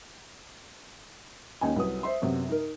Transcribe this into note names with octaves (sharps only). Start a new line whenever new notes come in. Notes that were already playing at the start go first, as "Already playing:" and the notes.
D#2 C#4 D#5 G#5
C2 F#3 B4 D#6
C5 E5 C6
F#2 C3 B3
D#4 A#4